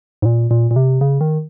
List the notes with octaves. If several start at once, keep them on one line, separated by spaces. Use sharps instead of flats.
G#2
A#2
A#2
A#2
C3
C#3
D#3